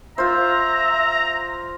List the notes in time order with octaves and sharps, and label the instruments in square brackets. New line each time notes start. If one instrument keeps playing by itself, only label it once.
[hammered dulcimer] F4 C5 [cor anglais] E5 [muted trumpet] A#5